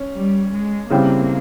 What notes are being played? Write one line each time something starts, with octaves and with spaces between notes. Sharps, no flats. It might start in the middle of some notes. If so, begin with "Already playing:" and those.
Already playing: C#4
G3
G#3
C#3 E3 G3 A#3 C4